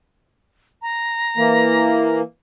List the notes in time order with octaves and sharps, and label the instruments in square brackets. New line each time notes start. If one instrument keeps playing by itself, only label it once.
[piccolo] A#5
[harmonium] E3 A#3